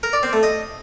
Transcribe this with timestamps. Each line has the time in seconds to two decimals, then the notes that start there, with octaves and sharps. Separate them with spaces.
0.03 A#4
0.13 D5
0.23 C4
0.33 A3
0.43 D#5